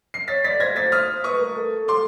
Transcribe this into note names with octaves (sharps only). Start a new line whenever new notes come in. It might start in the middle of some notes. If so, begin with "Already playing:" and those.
C7
C#5 A6 B6
D5 A6 B6
C5 G#6 A#6
A6 B6
D#6 F6
B4 C#6 D#6
A#4
A4
C6 D6